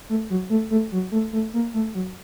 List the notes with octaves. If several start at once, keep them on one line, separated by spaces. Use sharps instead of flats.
A3
F#3
A3
A3
F#3
A3
A3
A#3
A3
F#3